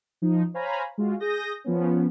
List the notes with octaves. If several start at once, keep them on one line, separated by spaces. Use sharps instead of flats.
F3 D#4
C5 C#5 F5 G#5 A#5 B5
G#3 F4 F#4
G#4 D#6 G6 A#6
F3 B3 C#4